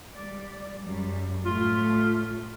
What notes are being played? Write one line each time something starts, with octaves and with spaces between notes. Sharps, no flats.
G3 D5
F#2 G3
A2 A3 F4